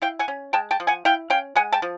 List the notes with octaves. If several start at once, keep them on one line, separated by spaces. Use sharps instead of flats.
E4 F5 G5
F#5 G#5
C#4
G#3 G5 A5
G5 A5
F3
F#5 G#5
E4 F5 G5
C#4 F5 G5
G#3 F#5 G#5
G5 A5
F3